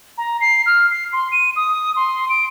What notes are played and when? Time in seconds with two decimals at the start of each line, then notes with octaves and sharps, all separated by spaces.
0.18 A#5
0.41 C7
0.66 F6
0.91 C7
1.13 C6
1.32 D#7
1.56 D#6
1.96 C6
2.29 D7